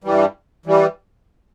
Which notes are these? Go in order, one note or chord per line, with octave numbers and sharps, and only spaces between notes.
G2 E3 G3
E3 G3